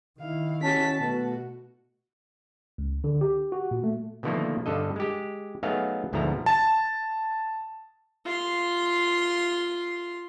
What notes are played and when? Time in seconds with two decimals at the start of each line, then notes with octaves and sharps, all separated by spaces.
0.20 D#3 E4 F5
0.63 C#4 F#4 A5 B6
1.00 B2 A3 F#4
2.78 C#2
3.04 D3
3.21 G4
3.52 F#4
3.71 A#2
3.84 A3
4.23 B2 D3 D#3 F3 A3 A#3
4.66 G2 D3 A4 D#5
4.96 G#3 G4
5.63 F#3 A3 B3 D#4 G#4 F5
6.13 D2 G#2 B2 F3 A3 A#5
6.46 A5
8.26 F4 C6